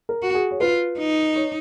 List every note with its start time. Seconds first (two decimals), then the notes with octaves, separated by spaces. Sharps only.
0.09 A#4
0.22 F#4
0.34 G#4
0.51 C#5
0.60 F4 B4
0.98 D#4
1.36 C#5